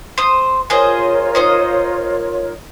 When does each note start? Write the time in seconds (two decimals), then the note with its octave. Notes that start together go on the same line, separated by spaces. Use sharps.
0.18 C5 C6 D#6
0.70 F4 G#4 A#4 C5 C#5 D#5
1.35 D#4 C5 D#5